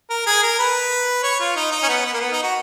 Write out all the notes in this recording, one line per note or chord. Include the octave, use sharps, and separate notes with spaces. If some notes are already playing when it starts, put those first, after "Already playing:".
A#4
G#4
A#4
B4
C#5
F4
D#4
D#4
C#4
B3
B3
A#3
B3
D#4
F#4